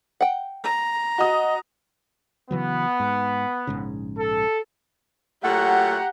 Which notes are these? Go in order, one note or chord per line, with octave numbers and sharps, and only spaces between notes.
F#5 G5
A#5
F#4 D#5 D#6
C#3 E3 F#3 B3
G#2
A#1 G#2 C#3
A4
A#2 F#3 A3 G4 F#5 A#5